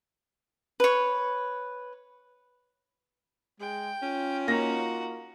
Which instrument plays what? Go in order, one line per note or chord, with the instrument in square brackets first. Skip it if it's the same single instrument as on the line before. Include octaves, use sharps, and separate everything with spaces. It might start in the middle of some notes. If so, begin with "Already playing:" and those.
[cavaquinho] B4 C#5
[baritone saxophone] G#3 [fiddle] G5
[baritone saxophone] C#4 [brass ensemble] F4
[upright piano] A#3 A#6 [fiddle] D#4 F#4